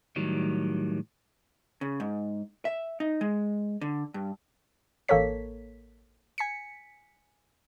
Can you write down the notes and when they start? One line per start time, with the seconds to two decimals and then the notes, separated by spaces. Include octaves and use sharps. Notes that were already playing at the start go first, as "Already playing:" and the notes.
0.16 A2 D#3 F#3 G3
1.81 C#3
2.00 G#2
2.65 E5
3.00 D#4
3.21 G#3
3.81 D3
4.14 G2
5.08 A1 A#3 A4 A#4 C#5 B6
6.38 G#5 B6 C#7